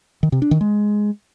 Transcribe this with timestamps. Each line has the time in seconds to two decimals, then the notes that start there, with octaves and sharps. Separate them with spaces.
0.23 D#3
0.32 C3
0.42 D4
0.51 D#3
0.61 G#3